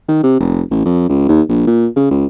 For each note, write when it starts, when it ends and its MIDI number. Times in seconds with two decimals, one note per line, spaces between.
0.09 0.21 51
0.24 0.38 48
0.40 0.62 29
0.71 0.82 33
0.85 1.05 41
1.09 1.24 37
1.29 1.42 39
1.49 1.64 34
1.67 1.87 46
1.96 2.07 49
2.11 2.26 37